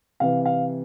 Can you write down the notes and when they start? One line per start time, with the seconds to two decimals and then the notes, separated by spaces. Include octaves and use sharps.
0.20 C3 E3 F5
0.45 F5